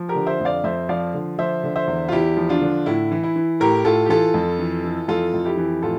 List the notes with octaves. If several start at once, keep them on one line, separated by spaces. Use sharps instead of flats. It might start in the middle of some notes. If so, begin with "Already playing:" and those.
Already playing: F3
G4 A#4
D3
C5 E5
F2
D5 F5
F2 C5 E5
F3 D5 F5
D3
F3 C5 E5
D3
C5 E5
E2
F4
E2 E4 G4
F3
D4 F4
D3
A2 E4
E3
E4
E3
A2 G4 A#4
A2 F4 A4
G4
E3 F4 A4
F2
E3
E3
F2 F4 A4
F2
E4 G4
E3
A2 F4 A4